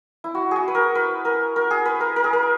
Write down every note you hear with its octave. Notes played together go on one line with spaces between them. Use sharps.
E4
F#4
F#4 G#4
B4
A#4
B4
A#4
A#4
G#4
B4
A#4
A#4
G#4
A#4